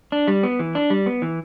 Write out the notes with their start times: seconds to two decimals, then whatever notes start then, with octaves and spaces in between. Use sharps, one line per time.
0.12 D4
0.28 G3
0.43 B3
0.59 E3
0.75 D4
0.90 G3
1.06 B3
1.22 E3